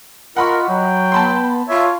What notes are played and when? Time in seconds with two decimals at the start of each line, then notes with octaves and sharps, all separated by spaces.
0.37 F4 A#4 D#5 F#5 B5 C#6
0.69 F#3 G5
1.12 B3 A5 B5 C6
1.69 F4 C#5 E5